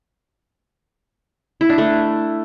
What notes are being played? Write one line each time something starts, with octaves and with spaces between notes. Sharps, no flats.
E4
D4
A3